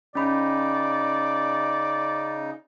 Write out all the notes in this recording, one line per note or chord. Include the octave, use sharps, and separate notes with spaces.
C#3 C#4 D#4 D5 B5